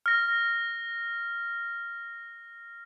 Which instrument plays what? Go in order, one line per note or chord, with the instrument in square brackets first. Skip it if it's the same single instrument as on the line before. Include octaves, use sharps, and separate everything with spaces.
[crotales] F6 A#6